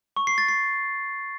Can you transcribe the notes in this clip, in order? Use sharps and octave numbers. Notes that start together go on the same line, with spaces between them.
C#6
C7
A6
C7